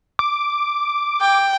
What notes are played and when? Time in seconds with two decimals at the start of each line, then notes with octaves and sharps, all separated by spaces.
0.19 D6
1.21 G5